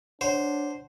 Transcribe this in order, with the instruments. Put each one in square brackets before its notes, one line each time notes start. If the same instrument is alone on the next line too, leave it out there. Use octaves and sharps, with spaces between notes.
[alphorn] D4 [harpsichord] C5 [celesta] C#5 F#5